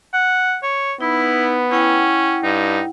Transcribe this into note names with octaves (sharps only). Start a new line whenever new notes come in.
F#5
C#5
B3 D#4 E4
C#4 E4 F#5 G5
G2 D#4